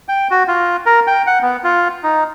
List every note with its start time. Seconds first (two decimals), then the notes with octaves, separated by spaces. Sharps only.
0.08 G5
0.31 F#4
0.48 F4
0.86 A#4
1.07 G5
1.27 F#5
1.42 B3
1.64 F4
2.03 D#4